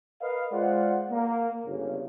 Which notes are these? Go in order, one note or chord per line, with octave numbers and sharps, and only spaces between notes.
A#4 B4 D#5 F5
G#3 F4 C5 D5 F#5
A#3
G1 C#3